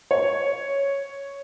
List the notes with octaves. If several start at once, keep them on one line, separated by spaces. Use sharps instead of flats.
C#5